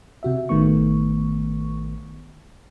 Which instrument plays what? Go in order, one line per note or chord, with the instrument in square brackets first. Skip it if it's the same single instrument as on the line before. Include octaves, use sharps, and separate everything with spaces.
[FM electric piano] C3 F#4 E5
A1 D#3 A3 B3 C#6